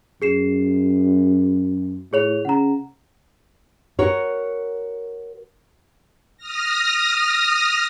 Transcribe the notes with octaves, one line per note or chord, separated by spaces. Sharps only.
F#2 G#4 C7 E7
A2 G#4 C#5 F7
C#3 F#5 A#5
F#4 A#4 C#5
D#6 F6 A#6